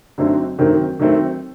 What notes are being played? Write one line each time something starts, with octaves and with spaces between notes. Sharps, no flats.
D3 F#3 A3 C4 D#4
D#3 F#3 A3 C4
D#3 F#3 A3 C4